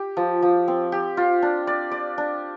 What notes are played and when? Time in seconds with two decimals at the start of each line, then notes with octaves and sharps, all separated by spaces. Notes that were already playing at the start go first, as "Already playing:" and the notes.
Already playing: G4
0.17 F3
0.42 F3
0.68 C4
0.92 G4
1.17 F4
1.42 D4
1.67 D5
1.92 D5
2.18 D4